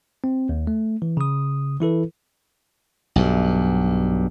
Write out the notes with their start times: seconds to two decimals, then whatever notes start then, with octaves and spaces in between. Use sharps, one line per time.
0.24 C4
0.49 D#2
0.67 A3
1.02 E3
1.17 C#3 D#6
1.80 E3 E4 A4 B4
3.16 B1 G2